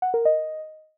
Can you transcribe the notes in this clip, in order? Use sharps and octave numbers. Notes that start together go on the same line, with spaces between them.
F#5
A#4
D#5